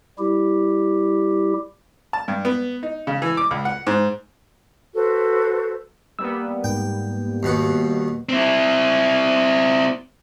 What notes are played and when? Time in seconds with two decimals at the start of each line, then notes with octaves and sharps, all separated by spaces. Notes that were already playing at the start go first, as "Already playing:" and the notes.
0.19 G3 E4 G4
2.13 A5
2.28 G2
2.45 B3
2.83 D#4
3.07 C#3
3.22 E3
3.37 D6
3.51 C#2
3.65 F#5
3.87 G#2
4.95 F#4 A4 B4 C5
6.19 G3 A#3 B3 E6
6.64 G#2 G5
7.43 D#2 B2 F#5
8.29 C4 E4